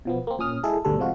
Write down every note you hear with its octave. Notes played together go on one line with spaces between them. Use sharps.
B2 F3 B3
A#3 C4
A#2 C#4 D#6 F6
G#3 E4 G#4 A4
G#1 D2 B2 D3 G3 A4
C3 F3 G#3 F4 F#4